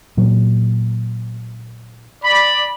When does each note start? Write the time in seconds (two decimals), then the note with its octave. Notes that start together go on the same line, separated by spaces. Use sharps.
0.17 A#2 F#3
2.24 D5 B5